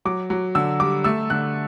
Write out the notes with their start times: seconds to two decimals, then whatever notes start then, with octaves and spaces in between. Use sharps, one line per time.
0.05 F#3 D6
0.30 F#3
0.55 D3 E6
0.80 G3 D6
1.04 A3 E6
1.30 D3 F#6